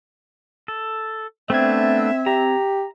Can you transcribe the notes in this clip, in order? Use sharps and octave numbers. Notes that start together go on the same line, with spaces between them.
A4
A3 B3 C4 D4 E5 G#6
G4 A#5